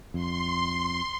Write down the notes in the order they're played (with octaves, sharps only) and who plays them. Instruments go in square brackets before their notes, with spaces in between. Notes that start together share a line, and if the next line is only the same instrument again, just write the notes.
[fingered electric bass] F2 [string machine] C6